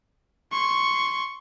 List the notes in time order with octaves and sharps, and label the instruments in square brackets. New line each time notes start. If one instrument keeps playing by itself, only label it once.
[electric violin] C6 C#6